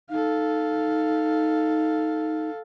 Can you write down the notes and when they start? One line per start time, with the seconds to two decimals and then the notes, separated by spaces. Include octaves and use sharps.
0.10 D#4 A4 F5